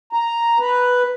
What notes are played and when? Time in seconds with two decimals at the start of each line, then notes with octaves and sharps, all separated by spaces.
0.13 A#5
0.59 B4